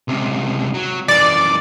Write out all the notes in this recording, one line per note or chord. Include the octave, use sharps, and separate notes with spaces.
C#2 C3
F#3
F#2 E3 D5